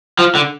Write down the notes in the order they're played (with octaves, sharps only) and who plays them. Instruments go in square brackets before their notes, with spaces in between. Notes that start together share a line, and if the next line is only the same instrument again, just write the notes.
[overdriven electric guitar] F3
D3